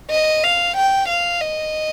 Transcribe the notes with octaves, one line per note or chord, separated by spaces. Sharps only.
D#5
F5
G5
F5
D#5